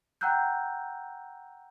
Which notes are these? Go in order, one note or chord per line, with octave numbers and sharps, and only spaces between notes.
F#5 G5 A#5 E6 F#6 G6